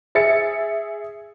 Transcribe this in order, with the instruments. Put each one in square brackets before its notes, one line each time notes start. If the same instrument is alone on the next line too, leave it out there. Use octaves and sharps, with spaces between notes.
[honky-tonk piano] G#4 E5 A6 C#7